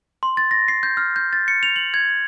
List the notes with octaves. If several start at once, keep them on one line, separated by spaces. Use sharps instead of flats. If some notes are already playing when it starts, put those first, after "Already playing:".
C6
A6
A#6
C7
G6
F6
G6
A6
C#7
F7
F#7
G#6